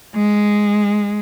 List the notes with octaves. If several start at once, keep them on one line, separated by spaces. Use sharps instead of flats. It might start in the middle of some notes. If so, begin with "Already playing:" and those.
G#3